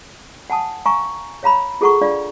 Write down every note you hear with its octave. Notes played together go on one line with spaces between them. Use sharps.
F#5 G#5 A5 D#6
F5 G#5 A#5 C#6
C#5 F5 A#5 B5
F4 G#4 A4 F#5 A#5 C#6
D4 F4 D5 F5